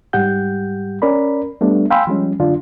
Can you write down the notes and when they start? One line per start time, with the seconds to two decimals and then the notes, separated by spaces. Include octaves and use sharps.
0.13 G#2 G3 G4 F#5 G6
1.02 C#4 A#4 D5 B5
1.61 G3 A3 B3 D4 G4
1.90 F5 G5 G#5 B5 C6 E6
2.07 F3 G3 G#3 C#4
2.40 F#2 D3 D4 F4